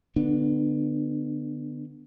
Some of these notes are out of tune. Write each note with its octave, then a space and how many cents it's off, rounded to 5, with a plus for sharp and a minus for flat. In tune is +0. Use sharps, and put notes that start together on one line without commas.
D3 +0 B3 +0 D4 +35